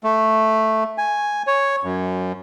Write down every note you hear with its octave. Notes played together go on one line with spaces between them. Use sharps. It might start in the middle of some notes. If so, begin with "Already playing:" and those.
A3
G#5
C#5
F#2